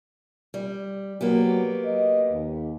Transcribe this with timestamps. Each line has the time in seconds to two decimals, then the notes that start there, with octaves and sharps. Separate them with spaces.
0.54 G3
1.21 F#3 A#3 B3 G4
1.85 D#5
2.32 D#2